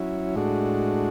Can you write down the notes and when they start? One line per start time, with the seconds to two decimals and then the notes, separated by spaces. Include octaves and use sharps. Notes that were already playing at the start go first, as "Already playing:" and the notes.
Already playing: F#3 C#4 E4
0.36 A2 G#3 D4 F#4